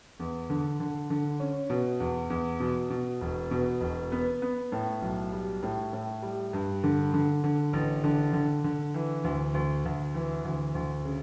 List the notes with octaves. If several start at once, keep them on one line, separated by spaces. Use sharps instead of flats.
E2
D3
D3
D3
C#4
B2
E2
E2
B2
B2
E1
B2
E1
B3
B3
A2
B1
G3
A2
A2
G3
G2
D3
D3
D3
A1
D3
D3
D3
E3
D2
D2
D2
E3
D2
D2
C#3